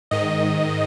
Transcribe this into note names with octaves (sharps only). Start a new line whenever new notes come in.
G#2 D#3 D#5